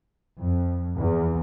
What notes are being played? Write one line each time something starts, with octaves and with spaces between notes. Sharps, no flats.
F2
E2